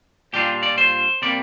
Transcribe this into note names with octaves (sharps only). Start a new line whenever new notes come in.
A#2 G3 D4 F4 G4
D5
C5
C3 G3 A#3 D5